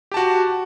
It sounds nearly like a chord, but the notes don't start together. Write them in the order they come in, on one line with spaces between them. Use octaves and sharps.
G4 A5 F#4